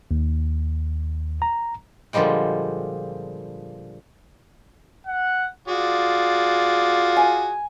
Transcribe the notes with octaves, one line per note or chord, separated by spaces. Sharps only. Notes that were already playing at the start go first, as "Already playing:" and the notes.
D#2
A#5
A#2 D3 F3 G3 G#3 G5
F#5
F4 F#4 G#4 D5
G#5